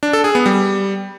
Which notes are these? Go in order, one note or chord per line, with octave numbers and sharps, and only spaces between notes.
D4
A4
G#4
B3
G3